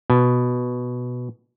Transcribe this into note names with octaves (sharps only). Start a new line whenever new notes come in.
B2